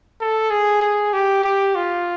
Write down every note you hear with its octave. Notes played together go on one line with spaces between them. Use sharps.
A4
G#4
G#4
G4
G4
F4